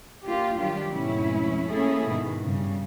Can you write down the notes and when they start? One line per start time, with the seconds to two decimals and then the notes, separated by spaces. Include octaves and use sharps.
0.25 A#3 D4 F4 G4
0.57 D#3 F#3 G3 D4 F4 G4
0.91 F2 G#2 B2 A3 C#4 E4
1.70 A3 A#3 C#4 E4 G#4 A4
2.08 G#2 B2 D#3
2.43 G2 C#3 G3